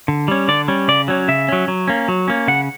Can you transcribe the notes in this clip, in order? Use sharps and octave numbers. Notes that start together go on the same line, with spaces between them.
D3
G3 C#4
D3 D5
G3 C#4
C#3 D5
F#3 C#4
C#3 E5
F#3 C#4
F#3
A#3 C#4
F#3
A#3 C#4
C#3 F#5